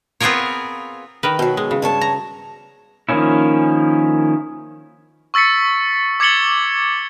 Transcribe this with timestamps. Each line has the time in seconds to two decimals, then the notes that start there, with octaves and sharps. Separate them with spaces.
0.20 B3 C4 F4 G#4 A#4 C#5
1.23 D#3 A#4 B4
1.39 B2 F#3
1.57 G#3
1.71 C#3
1.82 G2 C#5 A5
2.01 A#5
3.09 D#3 F3 A#3 C#4 E4
5.34 C#6 E6 A6 B6 C#7
6.20 D6 G#6 A6 C#7 F#7 G7